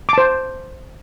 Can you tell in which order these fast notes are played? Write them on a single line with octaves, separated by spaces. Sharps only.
D6 A5 C5